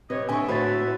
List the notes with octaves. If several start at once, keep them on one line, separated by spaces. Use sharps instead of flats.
C3 B4 C#5 D#5
D3 D#5 E5 G#5 C#6
A2 D3 F#4 B4 C#5 F#5 A6